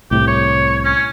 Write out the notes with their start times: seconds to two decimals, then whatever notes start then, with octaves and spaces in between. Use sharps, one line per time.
0.11 C2 A2 C3 G4
0.27 C#5
0.85 C#4